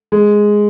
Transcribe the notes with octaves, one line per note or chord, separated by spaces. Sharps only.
G#3